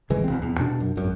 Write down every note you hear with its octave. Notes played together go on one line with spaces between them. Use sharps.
G#1 C#3 E3 G#3
E1 C4
E2
B2 D4
F#2
G#1 F#2